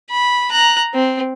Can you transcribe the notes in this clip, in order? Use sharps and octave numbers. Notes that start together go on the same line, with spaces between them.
B5
A#5 F#6
C4